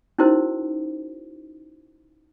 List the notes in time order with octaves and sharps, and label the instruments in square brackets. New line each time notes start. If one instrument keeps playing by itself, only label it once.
[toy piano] C#4 D#4 E4 F#4 A#4 C5